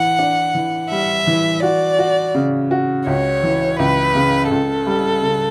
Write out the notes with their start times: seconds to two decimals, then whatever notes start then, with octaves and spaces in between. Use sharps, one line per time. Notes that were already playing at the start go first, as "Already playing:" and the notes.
Already playing: E3 F#5
0.19 D4
0.55 E3
0.91 G3 E5
1.27 E3
1.63 F#4 D5
1.99 F#4
2.35 C#3
2.71 F#4
3.07 C#2 C#5
3.43 E3
3.79 C#2 B4
4.15 C#3
4.50 C#2 A4
4.86 G3
5.22 C#3